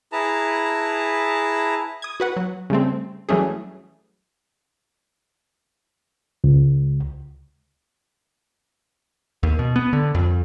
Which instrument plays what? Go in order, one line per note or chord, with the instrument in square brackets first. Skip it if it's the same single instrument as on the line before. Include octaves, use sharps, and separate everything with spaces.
[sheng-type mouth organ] E4 G#4 B4 A5 A#5
[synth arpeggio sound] D#6 G#6
F#4 B4 F#5
F#3
C#3 G3 A3 C4
E3 F#3 G3 A3 C#4 G#4
[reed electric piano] C#2
[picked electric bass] D#2
B2
B3
D3
F2